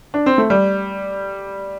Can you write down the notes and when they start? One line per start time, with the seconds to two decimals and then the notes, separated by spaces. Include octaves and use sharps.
0.14 D4
0.26 C4
0.38 A3
0.50 G3